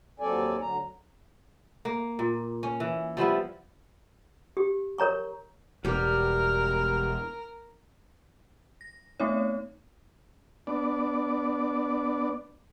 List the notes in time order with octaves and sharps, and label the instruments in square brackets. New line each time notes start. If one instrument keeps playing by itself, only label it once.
[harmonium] D#2 F#3 C4 A4 D5 G#5
D2 D3 F#3 A#5
[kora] A#3
A#2
C#4
E3
F3 G3 B3 E4
[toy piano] G4
A#4 C#5 A#5 C#6
[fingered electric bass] E1 [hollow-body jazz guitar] G3 G4 [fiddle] A#4 [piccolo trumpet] F6
[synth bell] A#6
A3 B3 C4 D#4 C#5
[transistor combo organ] B3 D4 D5